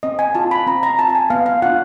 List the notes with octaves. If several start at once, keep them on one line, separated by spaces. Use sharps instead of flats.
C4 D#5
G#5
F4 A5
B5
C4 A#5
A#5
F4 A5
A5
G#5
B3 F5
F5
D4 F4 F#5